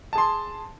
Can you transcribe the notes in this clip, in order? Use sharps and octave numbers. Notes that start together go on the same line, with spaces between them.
G#4 A5 C6